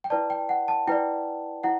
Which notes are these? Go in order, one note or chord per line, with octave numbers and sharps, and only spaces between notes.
G5
E4 B4 D5 A5
G5
F#5
A5
E4 B4 D5 G5
E4 F#5